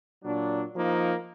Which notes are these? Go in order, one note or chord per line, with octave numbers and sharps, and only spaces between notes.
A#2 F#3 D4
F3 A#3 D#4